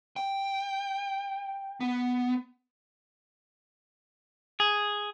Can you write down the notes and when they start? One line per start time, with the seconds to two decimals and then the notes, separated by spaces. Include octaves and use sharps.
0.16 G5
1.80 B3
4.60 G#4